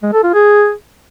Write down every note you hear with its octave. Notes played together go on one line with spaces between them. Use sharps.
G#3
A4
F4
G#4